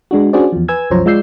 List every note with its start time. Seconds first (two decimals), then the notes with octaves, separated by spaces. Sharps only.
0.11 G#3 D4 F#4
0.33 C#4 D4 F#4 G#4 C5 D5
0.52 E2 F3
0.68 B4 G#5 E6 G#6
0.90 C2 F#2 F3 C5 C#5 A#5
1.06 G#3 F4 D5 E6 G6 C7